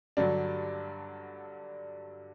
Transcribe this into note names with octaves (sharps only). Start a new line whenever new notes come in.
G2 D3 F#3 D4